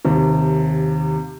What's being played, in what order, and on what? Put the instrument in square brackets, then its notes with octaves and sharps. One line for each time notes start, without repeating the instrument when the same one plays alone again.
[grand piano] D#2 C3